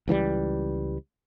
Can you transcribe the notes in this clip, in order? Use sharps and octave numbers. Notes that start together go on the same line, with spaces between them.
C#2 E3 F3 G3